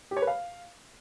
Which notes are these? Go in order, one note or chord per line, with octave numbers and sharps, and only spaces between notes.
G4
C#5
B4
F5